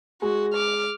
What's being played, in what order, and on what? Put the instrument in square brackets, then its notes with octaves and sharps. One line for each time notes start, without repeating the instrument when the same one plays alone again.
[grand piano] G#3 [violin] F#4 [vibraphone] G#4
[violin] D6 F6